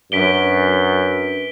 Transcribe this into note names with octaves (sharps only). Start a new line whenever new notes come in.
F#2 D4 B4 B6 D7 G7